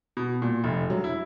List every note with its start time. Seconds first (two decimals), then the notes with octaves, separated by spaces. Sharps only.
0.17 B2
0.42 A#2
0.64 F1
0.90 F#3
1.04 E4